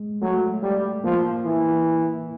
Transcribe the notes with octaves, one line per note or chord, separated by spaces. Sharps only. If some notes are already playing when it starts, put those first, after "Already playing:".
Already playing: G#3
F#3 A3
G3
F3 A#3
E3